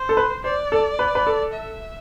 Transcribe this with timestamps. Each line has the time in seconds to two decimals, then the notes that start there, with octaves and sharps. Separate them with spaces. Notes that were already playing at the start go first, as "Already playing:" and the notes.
Already playing: C5
0.09 A4
0.17 B4
0.44 C5 D5
0.72 A4
0.99 B4
1.15 B4
1.27 A4
1.53 E5